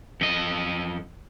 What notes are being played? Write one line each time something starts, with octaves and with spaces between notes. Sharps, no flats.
F2 D#5